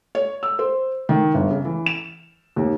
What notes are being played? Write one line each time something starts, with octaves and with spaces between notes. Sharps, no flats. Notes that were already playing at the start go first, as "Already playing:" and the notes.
C#5
E6
C5
D#3
G1
C#3
E3
E7
D#2